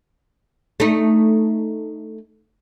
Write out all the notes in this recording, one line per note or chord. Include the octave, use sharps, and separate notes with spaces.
A3 D#4